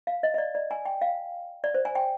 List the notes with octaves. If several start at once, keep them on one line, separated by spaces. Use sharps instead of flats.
F5
D#5
D#5
D5
D5
G#5
G5
F5
D5
C5
G#5
G5